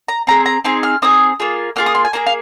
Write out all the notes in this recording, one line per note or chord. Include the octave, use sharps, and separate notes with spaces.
A#5
C4 D#4 G#4 A#5
A#5
C4 D#4 G#4 C6
F6
C4 D#4 G#4 D#6
A#3 F4 G#4
A#3 F4 G#4 F6
D#6
C6
G#5
A#3 F4 G#4 A#5
F5